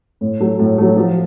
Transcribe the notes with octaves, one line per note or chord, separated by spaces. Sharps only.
A2
F#3 A3
A2
F#3 A3
F3